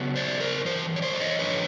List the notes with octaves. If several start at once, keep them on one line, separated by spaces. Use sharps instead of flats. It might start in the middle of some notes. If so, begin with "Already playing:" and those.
Already playing: C#3 F#3 B3
C5 D5
A#4 C5
G2 E3 C5
C#5
C5 D5
D5
C#5 D#5
G2 D3 F3 B4 C#5